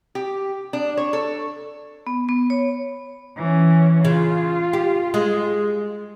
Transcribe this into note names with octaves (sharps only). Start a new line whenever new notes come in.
G4
D4
C#5
A4
B3
B3
C#5
E3 C#4
C#3 F4
G4
G#3